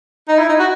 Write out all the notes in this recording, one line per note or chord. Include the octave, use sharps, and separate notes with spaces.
D#4
E4
D#4
F#4